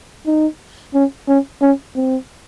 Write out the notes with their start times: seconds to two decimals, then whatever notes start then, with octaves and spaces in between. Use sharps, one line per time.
0.26 D#4
0.94 C#4
1.28 C#4
1.62 C#4
1.96 C4